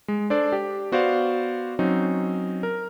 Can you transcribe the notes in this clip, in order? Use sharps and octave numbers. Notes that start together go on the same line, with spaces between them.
G#3
D4 A4 C5 D5
G4
B3 F#4 C5 D5 F5
F#3 C4 C#4 D#4
A#4